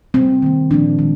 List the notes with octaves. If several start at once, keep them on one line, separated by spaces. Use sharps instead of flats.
C3 G3 A#3 C4
D#3 A#3
A#2 F3 A#3 D4
D#3 G#3